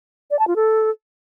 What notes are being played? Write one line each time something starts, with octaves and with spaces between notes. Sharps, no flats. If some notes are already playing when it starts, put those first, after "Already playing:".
D5
A5
F4
A4